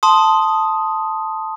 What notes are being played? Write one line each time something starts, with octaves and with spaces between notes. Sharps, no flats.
A5 C6 D#6